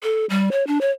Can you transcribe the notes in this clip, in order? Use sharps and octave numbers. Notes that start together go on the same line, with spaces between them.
A4
G3
C#5
D4
C#5